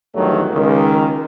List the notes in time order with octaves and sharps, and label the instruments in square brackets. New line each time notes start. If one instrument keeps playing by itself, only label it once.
[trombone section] E2 G2 D#3 F#3 A3
C#2 D#3